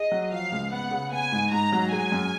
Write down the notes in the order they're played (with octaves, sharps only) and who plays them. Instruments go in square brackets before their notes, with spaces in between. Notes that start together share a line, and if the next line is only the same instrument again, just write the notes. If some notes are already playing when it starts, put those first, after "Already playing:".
Already playing: [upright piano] G#4 [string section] D#5
[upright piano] F#3
[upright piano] F3 [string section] F5
[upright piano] C#2
[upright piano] B3 [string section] F#5
[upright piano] C#3
[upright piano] B3 [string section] G#5
[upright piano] G#2
[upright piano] G#2 [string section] A#5
[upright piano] F#3
[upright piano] G#3 [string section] G#5
[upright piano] F#2